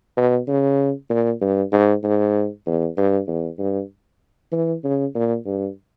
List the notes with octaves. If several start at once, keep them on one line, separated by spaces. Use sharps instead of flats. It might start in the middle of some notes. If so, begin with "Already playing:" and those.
B2
C#3
A#2
G2
G#2
G#2
E2
G2
E2
G2
E3
C#3
A#2
G2